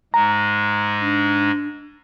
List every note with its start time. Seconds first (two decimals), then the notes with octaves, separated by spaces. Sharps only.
0.14 G#2 G#3 A#5
1.01 D4